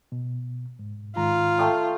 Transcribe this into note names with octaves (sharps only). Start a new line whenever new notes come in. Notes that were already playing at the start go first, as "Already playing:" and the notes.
B2
G#2
G#2 D#3 F4 A#5
A3 G5 D#6